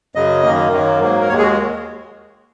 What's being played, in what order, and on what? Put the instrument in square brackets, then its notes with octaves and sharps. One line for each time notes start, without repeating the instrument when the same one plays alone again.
[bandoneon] F#2 C#3 F#3 D#5
F#2 D#3 A#3
F#2 D#3 F#3 A#3
G#2 F#3 A#3
A#4
D#2 D#3 G#3 C#5
G#4
F#4